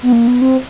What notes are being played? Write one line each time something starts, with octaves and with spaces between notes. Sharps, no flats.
B3
A#3
B3
C4